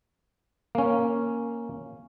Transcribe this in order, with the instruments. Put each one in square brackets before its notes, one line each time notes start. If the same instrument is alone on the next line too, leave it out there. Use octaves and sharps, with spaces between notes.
[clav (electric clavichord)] A#3 C#4